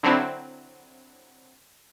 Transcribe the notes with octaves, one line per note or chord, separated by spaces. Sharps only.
D3 F#3 C4 E4